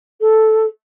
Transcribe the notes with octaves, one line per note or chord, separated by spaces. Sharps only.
A4